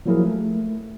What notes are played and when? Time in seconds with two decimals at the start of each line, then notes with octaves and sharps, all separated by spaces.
0.06 F3 F#3 A#3 E4 G#4 A#4
0.24 A3